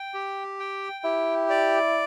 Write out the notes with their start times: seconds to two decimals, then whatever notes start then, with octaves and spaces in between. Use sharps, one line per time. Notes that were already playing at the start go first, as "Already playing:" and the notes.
Already playing: G5
0.14 G4
0.60 G5
1.04 E4 G4
1.50 D5